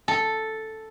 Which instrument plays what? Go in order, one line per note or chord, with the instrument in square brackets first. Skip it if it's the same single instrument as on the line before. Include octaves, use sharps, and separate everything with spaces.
[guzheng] A4